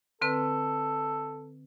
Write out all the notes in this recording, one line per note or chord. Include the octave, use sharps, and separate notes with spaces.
D3 C4 A4 B4